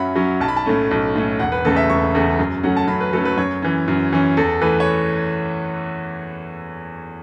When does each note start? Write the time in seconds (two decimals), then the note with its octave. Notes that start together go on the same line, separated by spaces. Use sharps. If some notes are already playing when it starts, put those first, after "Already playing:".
Already playing: F#2 F#3 C#4 E5 F#5 B5
0.16 F#3 C#4
0.40 B1 A5
0.48 B5
0.57 A5
0.66 A2 A3 C#4
0.91 B1
1.16 A2 A3 C#4
1.39 E1 F#5
1.52 B4
1.65 E2 C#3 A3 A4
1.76 E5
1.90 E1 C#6
2.15 E2 C#3 A3
2.39 F#2
2.63 F#3 A3 C#4 F#5
2.77 A5
2.88 F#2 B5
3.01 B4
3.13 F#3 A3 C#4 A4
3.25 B4
3.37 F#2 C#5
3.62 E3 C#4
3.88 F#2
4.13 E3 C#4
4.37 E2 A4
4.62 E3 A3 B4
4.80 C#5